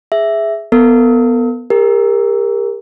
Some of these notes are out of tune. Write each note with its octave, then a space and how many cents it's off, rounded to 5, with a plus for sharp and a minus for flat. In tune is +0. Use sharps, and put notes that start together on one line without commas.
G#4 +0 E5 +0
B3 +0 A4 +45
G4 +45 A#4 +0